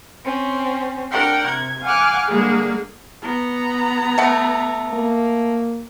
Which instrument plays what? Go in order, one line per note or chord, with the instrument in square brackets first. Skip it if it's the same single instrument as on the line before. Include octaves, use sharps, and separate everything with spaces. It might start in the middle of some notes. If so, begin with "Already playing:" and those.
[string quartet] C4 C#4
D4 A#4 F#5 G5
C3 G#6
F5 F#5 G#5 D6 F6 F#6
D3 G3 G#3 A#3 G#4
[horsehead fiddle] B3 A#5
[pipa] A3 F#5
[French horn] A#3